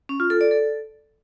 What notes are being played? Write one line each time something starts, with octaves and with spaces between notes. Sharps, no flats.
C#4
F4
A4
D5
A4